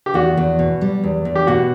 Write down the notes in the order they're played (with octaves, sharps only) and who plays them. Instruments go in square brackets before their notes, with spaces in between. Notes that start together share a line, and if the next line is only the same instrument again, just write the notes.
[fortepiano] G4
[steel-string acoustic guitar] E2 [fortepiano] F#4
[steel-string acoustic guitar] E2
B2
G3
E2
E2
[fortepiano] G4
[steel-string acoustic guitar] B2 [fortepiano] F#4